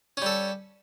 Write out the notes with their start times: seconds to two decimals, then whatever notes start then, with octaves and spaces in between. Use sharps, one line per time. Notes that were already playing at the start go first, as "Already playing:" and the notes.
0.17 C#4
0.22 G3
0.26 A4